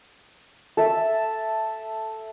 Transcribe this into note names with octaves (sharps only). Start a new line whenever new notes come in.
A4 E5